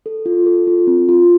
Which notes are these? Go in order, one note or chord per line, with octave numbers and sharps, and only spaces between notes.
A4
F4
A4
F4
C4
F4